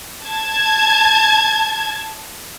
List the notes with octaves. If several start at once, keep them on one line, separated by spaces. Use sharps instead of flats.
A5 G#6